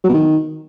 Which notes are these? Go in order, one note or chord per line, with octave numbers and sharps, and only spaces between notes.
F#3
B2
D#3